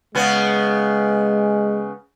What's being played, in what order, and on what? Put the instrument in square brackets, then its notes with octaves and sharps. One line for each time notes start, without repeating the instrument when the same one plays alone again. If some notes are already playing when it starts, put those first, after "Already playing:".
[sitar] C#3 B3 C#4 [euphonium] G#3